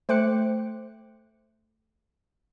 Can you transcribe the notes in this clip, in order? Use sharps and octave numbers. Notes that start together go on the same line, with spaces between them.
A3 C5 G5 D6 F#6 C#7